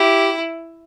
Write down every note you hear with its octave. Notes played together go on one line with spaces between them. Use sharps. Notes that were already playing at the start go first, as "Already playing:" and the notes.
Already playing: E4 G4